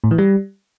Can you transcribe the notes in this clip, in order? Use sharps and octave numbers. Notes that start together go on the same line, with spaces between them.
A2
E3
G3